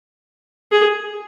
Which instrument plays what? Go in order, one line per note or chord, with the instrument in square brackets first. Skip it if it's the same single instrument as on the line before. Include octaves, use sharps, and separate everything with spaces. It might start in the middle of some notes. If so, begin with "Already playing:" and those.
[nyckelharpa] G#4